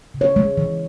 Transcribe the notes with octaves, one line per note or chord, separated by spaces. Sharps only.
C#3
C#5
G#3
E3